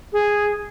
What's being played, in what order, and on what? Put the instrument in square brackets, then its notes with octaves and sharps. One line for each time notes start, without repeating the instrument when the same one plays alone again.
[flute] G#4